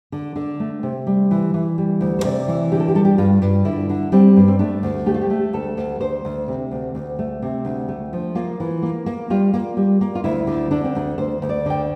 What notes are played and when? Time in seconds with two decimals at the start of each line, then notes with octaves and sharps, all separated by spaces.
0.12 D3
0.36 D3
0.60 A3
0.83 C3
1.07 G3
1.31 E3
1.54 E3
1.78 G3
2.01 D2
2.19 C5
2.24 C3 D5
2.48 E3
2.72 D3 G4
2.80 A4
2.88 G4
2.95 G3 A4
3.05 G4
3.18 G2 F4
3.42 G2
3.65 D3 E4
3.89 D3
4.12 G3 C4
4.36 G2
4.48 C4
4.59 A3 D4
4.83 D2
5.06 A3 G4
5.14 F4
5.21 G4
5.30 A3
5.53 D2 A4
5.77 D2
6.00 D2 C5
6.25 D2
6.48 C3
6.71 D2
6.95 D2
7.19 A3
7.42 C3
7.65 D2
7.88 A3
8.13 F3
8.35 A#3 F4
8.60 E3
8.82 A#3
9.06 A#3
9.30 G3 F4
9.54 A#3
9.77 G3
10.01 A#3
10.15 F4
10.24 D2 E4
10.47 D3
10.71 D3 D4
10.84 C4
10.95 D2 D4
11.18 D2 C5
11.42 D2
11.49 D5
11.66 D3 G5